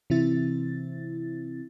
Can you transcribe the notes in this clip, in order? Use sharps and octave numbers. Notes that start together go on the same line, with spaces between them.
C3 E3 C4 E4 A6